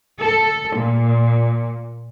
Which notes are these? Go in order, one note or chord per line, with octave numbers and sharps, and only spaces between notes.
A4
A#2